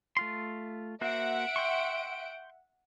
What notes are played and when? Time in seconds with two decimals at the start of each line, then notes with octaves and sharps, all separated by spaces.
0.17 A3 F4 C6
1.01 A#3 F#4 C5 E5 F#5 D7
1.56 G5 C6 C#6